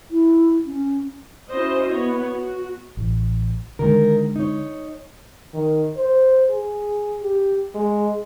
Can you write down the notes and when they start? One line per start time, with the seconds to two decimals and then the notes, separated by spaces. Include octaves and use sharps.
0.11 E4
0.66 C#4
1.49 C#4 E4 F#4 C5 D#5
1.92 B3 C#5
2.32 F#4
2.97 A1
3.79 D3 D#3 G#3 A#4
4.36 D#4 C#5
5.54 D#3
5.97 C5
6.49 G#4
7.23 G4
7.75 G#3